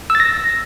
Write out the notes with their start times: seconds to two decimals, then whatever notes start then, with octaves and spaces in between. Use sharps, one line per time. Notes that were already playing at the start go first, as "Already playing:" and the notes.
0.10 E6
0.15 A6
0.20 A#6